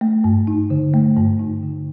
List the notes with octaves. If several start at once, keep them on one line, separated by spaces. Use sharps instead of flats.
A3
G2
D#4
D3
A3
G2
D#4
D3